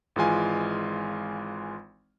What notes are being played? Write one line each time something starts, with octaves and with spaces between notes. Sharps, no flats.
G#1 E3 G#3 F4 G#5